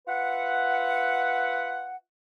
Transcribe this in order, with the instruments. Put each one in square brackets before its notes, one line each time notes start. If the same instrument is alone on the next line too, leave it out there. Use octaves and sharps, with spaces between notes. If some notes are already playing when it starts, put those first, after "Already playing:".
[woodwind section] F4 B4 E5 F#5